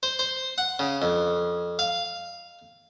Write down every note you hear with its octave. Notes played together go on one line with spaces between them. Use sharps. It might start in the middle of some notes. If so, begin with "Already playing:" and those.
C5
C5
F#5
C#3
F2
F5